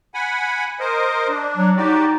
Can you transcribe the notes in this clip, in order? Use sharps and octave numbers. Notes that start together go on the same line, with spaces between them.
F#5 G#5 B5
A#4 C5 D#5
D4
F#3
D#4 F#4 G4 D5